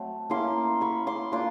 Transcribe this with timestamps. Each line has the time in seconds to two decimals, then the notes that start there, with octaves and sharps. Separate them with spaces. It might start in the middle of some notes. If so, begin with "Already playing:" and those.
Already playing: F#3 A3 C4
0.30 A#3 C#4 E4 C6 D6
0.81 B5 C#6
1.07 C6 D6
1.32 A#3 D4 F4 C6 D6